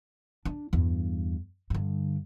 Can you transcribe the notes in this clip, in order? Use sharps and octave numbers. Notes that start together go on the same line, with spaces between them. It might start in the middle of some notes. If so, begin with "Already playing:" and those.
D4
E2 G2
G2 D3